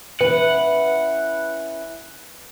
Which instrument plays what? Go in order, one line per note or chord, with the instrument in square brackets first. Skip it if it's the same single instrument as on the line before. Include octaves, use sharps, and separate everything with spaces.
[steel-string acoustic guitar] C#4 E4 [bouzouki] B4 [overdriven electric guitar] F#5